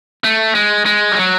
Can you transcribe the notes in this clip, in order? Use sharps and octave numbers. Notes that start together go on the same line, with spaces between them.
A3
G#3
G#3
G3
F#3